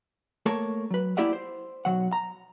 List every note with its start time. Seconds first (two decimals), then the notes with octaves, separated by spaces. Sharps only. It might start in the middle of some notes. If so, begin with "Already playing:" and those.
0.46 A3 A#3 A4 A#4 C#5 A5
0.91 F#3 B4
1.17 A#3 E4 G4 D5 E5 F#5
1.33 C5
1.85 B1 B2 F#3 F#5
2.13 A#5